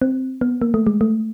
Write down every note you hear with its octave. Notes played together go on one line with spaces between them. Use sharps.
C4
B3
A#3
A3
G#3
A3